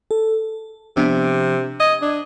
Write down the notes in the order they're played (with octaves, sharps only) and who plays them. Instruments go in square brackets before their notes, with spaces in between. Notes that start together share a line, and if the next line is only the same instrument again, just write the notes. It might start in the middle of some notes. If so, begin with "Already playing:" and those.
[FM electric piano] A4
[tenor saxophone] C3 [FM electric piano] F3 B3 D4
[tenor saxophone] D#5 [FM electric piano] G#6
[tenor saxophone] D4